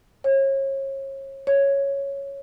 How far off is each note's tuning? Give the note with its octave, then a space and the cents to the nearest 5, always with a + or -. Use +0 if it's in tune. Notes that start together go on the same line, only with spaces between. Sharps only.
C#5 -35
C#5 +0